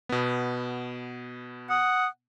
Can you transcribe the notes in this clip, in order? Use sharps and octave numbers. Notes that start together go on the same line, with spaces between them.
B2 B3
F#5 D#6